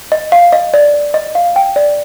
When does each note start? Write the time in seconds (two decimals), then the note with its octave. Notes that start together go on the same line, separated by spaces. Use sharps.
0.12 D#5
0.32 F5
0.52 D#5
0.74 D5
0.94 D5
1.14 D#5
1.35 F5
1.56 G5
1.76 D5